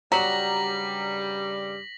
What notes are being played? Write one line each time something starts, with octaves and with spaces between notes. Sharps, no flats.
G2 C#3 F#3 G3 A#5 A#6 B6 F#7